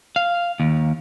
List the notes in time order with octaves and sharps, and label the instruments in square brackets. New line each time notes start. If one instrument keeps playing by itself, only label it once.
[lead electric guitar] F5
D#2